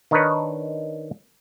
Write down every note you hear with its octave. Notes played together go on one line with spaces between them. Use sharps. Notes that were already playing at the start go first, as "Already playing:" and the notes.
D#3 D4 D#4 A#4 B4 C#5